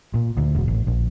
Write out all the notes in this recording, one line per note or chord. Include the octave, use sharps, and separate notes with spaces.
A#2
D2
E1
A1
A#1